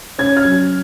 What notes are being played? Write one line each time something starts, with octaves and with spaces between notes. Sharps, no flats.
C#4 G#6
F6 G#6
F#3